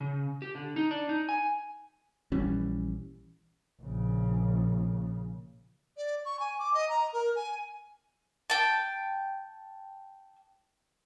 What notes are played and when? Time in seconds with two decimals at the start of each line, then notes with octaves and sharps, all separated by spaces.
0.01 C#3
0.42 G4
0.55 D3
0.76 D#4
0.91 D4
1.09 D#4
1.29 G#5
2.32 A#1 E3 G3 C#4
3.81 A#1 C#3
5.97 D5
6.25 C#6
6.40 G#5
6.59 D6
6.74 D#5
6.89 A#5
7.13 A#4
7.36 G#5
8.50 G5 A5